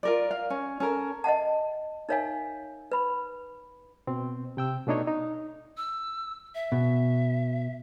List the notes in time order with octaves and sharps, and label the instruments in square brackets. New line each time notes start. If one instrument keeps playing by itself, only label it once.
[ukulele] F4 A#4 D5
F5
C#4
C#4 A4 A#4
[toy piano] D#5 E5 F#5 A5
D#4 A#4 C#5 E5 F5 G#5
B4 B5
[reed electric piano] B2 C4
C3 G5 E6
B2 A3 D4 D#4 C#5 D#5
D#4
[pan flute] E6
E5
[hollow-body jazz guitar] B2